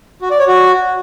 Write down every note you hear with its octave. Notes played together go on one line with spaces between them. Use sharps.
F#4
D5
C#5
F#4